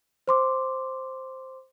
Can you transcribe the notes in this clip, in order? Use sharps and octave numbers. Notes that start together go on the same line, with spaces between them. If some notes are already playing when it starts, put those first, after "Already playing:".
C5 C6 D6